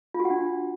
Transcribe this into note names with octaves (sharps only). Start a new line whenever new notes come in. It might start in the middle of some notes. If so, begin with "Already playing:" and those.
F4
F#4
F#5
D4